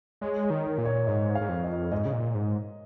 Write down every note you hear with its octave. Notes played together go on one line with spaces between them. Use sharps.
G#3 C#5
C#5
D#3
A#4
A#2
C#5
G#2 D#5
F5
G#2
F2
D#5
G#2 D#5
C#3
A#2
G#2